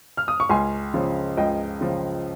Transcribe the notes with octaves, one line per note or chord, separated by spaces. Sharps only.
F6
D#6
C#6
C#2 G#5 C6
C#3 F3
C#2 D#5 G5
C#3 F3